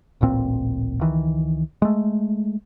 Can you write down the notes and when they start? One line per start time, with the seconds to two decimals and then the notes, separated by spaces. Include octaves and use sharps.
0.21 D1 A1 A#2 C4
1.01 C#2 D#3 E3
1.82 G#3 A3